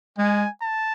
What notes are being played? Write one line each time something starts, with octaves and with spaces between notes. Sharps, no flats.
G#3 G#5
A5